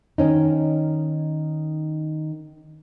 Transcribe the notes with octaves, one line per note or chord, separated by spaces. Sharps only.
D#3 C#4 D#4